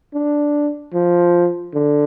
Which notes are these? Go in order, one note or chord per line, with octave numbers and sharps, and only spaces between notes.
D4
F3
D3